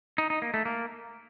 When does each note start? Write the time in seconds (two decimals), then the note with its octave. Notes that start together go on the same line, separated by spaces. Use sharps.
0.18 D#4
0.30 D#4
0.42 A#3
0.54 A3
0.65 A#3